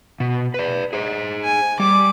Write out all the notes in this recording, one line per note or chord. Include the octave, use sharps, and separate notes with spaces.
B2
B4 D5
G#4 C5
G#5
G3 D6